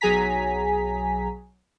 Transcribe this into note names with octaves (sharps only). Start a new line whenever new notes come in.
B1 F#3 G#4 G#5 A#5 B6